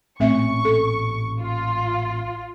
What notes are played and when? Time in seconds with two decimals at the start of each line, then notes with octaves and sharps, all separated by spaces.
0.20 A1 A#2 A3 C4 C#4 E5 C#6
0.65 A4
1.41 F4